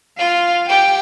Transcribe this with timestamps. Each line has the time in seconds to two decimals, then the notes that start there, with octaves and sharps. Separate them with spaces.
0.17 F4 F5
0.68 G4 G5